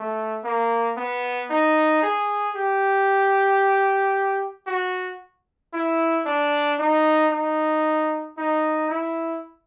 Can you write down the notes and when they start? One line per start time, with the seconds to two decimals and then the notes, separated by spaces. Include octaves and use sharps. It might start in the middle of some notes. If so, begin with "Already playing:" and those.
Already playing: A3
0.44 A#3
0.97 B3
1.50 D#4
2.02 G#4
2.55 G4
4.67 F#4
5.73 E4
6.25 D4
6.78 D#4
7.31 D#4
8.37 D#4
8.90 E4